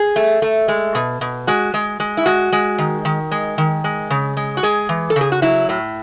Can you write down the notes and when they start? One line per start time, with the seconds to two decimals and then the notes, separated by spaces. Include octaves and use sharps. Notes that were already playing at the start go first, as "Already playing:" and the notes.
Already playing: G#4
0.16 A3
0.42 A3
0.68 G#3
0.95 B2
1.21 B2
1.47 G#3 F#4
1.74 G#3
2.00 G#3
2.17 E4
2.26 G#3 F#4
2.53 G#3
2.78 D#3
3.05 D#3
3.31 G#3
3.58 D#3
3.84 G#3
4.10 C#3
4.37 G#3
4.57 F#4
4.63 G#3 G#4
4.89 E3
5.10 A4
5.16 C#3 G#4
5.32 F#4
5.42 F#3 E4
5.69 A2